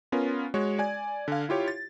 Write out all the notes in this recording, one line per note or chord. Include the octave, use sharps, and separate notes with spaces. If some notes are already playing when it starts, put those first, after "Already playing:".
B3 C#4 F4 A#4
G#3 F#4 C#5
D5 G#5 G#6
D3 F5
E4 F4 G4 C#5
A6